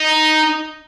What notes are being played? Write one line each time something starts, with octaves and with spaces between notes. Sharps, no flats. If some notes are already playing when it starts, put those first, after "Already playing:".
Already playing: D#4